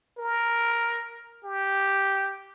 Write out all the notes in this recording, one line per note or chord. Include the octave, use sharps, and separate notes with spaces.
A#4
G4